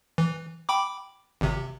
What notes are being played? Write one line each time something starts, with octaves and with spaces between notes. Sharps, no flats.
E3
G5 B5 D6
G#1 C3